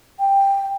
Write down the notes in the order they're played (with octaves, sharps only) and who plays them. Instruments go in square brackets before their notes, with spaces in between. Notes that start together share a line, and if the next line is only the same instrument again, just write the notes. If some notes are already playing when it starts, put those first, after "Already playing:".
[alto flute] G5